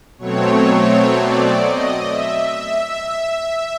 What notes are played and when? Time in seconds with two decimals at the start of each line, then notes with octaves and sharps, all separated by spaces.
0.18 B2 F#3 A3 C4 C#5
1.13 D5
1.60 D#5
2.07 E5